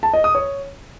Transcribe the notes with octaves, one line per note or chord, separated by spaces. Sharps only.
A5
D#5
D#6
C#5